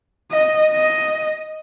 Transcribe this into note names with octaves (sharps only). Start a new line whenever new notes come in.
D#5
D#5